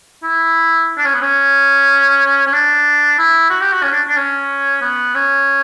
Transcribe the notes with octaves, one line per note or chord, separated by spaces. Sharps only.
E4
D4
C#4
B3
C#4
C#4
D4
E4
F#4
G4
F#4
C#4
D4
D4
C#4
B3
C#4